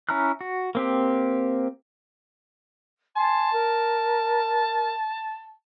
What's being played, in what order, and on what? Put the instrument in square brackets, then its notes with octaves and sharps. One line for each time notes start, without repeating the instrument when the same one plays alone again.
[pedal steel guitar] C#4 E4 A#5 F6 F#6
F#4
A#3 C4 G4
[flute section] G#5 C6 [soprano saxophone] A5
[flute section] A#4